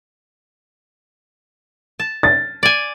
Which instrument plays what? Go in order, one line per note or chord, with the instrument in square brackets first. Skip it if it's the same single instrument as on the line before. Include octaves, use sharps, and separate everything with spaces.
[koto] A5
[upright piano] A6
[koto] D5 G#5